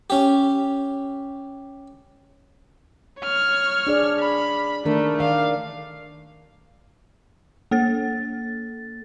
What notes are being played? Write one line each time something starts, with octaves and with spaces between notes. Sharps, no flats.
C#4 G4
C#5 F6
D4 G#4 D5
B5
D#3 A3 D4 A#4
D#3 A#4 D5 F5
A#3 A4 A6